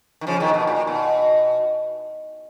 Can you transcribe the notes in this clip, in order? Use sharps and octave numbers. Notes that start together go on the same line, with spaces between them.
D#3
C#3 F3
B2 D#3
B2
A#2
B2